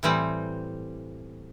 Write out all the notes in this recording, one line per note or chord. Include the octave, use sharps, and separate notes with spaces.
A2 E3 G3 C4